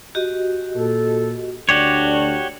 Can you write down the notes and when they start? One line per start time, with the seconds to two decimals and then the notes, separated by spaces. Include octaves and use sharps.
0.15 F#4 G4 D#5
0.76 A#2 A4
1.69 D2 D4 F#4 G4 C#5 D5